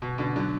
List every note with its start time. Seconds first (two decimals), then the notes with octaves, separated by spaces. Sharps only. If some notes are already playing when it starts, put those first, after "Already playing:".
0.02 B2
0.18 B2 D3
0.36 D3 F#3